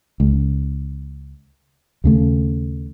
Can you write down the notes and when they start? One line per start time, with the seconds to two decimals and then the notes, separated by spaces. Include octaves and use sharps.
0.20 C#2
2.04 D#2 C#3 A3